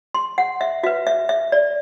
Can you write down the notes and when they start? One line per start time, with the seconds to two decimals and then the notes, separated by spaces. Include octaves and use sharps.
0.14 C6
0.38 F#5
0.61 E5
0.83 F#4 B4 E5
1.07 E5
1.29 E5
1.52 D5